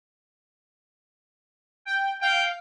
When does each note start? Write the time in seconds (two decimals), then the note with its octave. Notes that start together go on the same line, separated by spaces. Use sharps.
1.85 G5
2.22 F5 G5